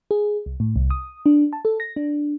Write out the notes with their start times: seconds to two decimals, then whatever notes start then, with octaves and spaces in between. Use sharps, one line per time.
0.11 G#4
0.46 C2
0.60 A2
0.76 C2
0.90 D#6
1.26 D4
1.53 A5
1.65 A4
1.80 A#6
1.96 D4